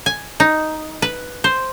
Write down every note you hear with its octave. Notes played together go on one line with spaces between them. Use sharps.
G#5
D#4
B4
C5